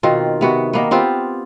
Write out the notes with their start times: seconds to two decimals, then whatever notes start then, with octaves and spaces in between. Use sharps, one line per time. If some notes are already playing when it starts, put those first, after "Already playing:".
0.03 B2 D#3 C4 F4
0.41 C3 B3 F#4
0.73 D#3 A#3 B3
0.91 B3 C4 F4 G4